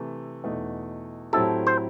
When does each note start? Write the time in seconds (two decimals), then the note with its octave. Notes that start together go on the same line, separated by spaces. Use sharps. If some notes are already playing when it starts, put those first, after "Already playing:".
Already playing: C3 E3 A3
0.44 E2 B2 A3 D#4
1.33 A2 F#3 C4 E4 G4 A4
1.67 C5